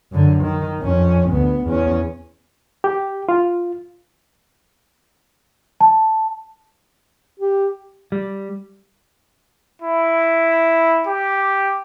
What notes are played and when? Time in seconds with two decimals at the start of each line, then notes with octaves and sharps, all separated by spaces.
0.12 F#2 D3
0.42 D#3
0.80 F2 C#4
1.31 D2 B3
1.66 E2 C#4
2.84 G4
3.29 F4
5.81 A5
7.39 G4
8.12 G3
9.82 E4
11.07 G4